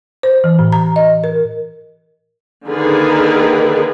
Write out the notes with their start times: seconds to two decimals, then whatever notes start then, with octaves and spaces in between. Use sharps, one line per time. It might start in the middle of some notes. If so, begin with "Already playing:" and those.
0.23 C5
0.44 E3
0.59 A2
0.72 A#5
0.96 D#5
1.24 A#4
2.66 D3 D#3 A#3 G#4 A#4 B4